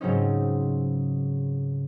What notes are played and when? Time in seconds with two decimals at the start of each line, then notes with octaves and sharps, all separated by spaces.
0.01 G#2 C#3 F#3 C4 C#4 D#4